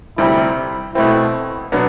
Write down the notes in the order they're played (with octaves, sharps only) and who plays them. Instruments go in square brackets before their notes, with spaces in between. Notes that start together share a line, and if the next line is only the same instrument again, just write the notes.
[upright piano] D2 C3 G3 C4 [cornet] E4
[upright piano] B2 A3 C4 [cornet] E4
[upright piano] B2 F#3 B3 D4